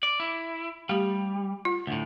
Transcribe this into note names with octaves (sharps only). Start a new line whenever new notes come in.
D5
E4
G3 A3 G4
F4
D2 A2